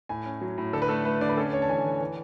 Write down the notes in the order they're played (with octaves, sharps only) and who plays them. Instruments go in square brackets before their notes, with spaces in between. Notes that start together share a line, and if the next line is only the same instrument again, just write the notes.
[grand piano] A2 G#5
C#4
F#3
A2
D3 A4
B4
A3 A4
A3 B4
D3 D5
B4
C#4 A4
C#4 C#5
A5
E3 G#5
E3
E3